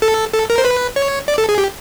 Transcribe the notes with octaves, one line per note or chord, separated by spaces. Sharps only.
A4
A4
A#4
C5
B4
C#5
D5
A4
G#4
G4